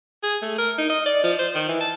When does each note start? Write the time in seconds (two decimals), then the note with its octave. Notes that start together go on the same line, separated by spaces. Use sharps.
0.23 G#4
0.42 A3
0.58 A#4
0.78 D#4
0.89 D#5
1.06 D5
1.23 F3
1.39 C5
1.55 D#3
1.68 E3
1.81 A5